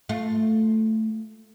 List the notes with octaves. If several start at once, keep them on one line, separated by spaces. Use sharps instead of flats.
A3 F4